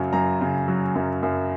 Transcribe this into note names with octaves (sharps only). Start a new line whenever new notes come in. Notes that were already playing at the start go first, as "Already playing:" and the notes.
Already playing: F#2 C#3 F#3
F#2 A#5
C#3
F#3
F#2
F#2